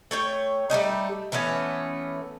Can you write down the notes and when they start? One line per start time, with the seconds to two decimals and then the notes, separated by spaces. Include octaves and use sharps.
0.11 A3 C#5 G5
0.70 G3 A3 C#4 D#4
1.32 E3 A3 B3 C#4